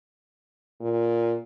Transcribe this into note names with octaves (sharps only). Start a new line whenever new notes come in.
A#2